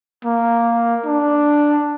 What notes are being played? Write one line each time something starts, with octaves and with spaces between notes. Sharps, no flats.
A#3
D4